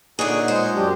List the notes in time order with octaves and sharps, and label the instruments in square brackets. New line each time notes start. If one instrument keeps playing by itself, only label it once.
[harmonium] A#2 [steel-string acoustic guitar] D3 G#4 [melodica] D#4 C#5 F#5
[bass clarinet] G#3 [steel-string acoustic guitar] C5
[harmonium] F#2 F#3 G4 [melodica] D4